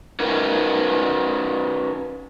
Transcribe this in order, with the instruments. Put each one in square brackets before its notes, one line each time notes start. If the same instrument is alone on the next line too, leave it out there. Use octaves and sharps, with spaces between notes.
[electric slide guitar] C#4 D#4 F#4 A#4 B4